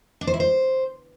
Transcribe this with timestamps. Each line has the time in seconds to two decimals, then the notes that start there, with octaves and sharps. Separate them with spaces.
0.21 D4
0.27 C5
0.34 E4
0.40 C5